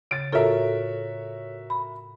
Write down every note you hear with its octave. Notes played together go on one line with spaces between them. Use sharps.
C#3 A6 D7
A2 F4 F#4 A4 A#4 C#5 E5
B5